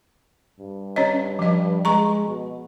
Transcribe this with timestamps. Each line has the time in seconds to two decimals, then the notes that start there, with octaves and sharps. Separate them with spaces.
0.59 G2
0.96 C#4 C#5 D#5
1.39 F3 D#5
1.85 G#3 A#5 C#6
2.27 B2